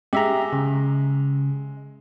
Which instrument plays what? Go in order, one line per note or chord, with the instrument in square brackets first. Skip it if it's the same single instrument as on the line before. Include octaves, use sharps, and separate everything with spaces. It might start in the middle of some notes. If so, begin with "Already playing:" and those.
[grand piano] G#3 [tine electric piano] G4 E5 A#5
[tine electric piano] C#3